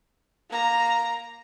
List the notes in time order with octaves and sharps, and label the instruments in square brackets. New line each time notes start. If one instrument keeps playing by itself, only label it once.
[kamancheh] A#3 A#5